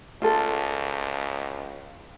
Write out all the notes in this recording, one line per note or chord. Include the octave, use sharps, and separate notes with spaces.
C#2 F4 A4